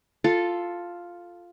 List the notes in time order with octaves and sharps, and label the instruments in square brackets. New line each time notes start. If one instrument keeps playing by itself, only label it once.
[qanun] F4 A4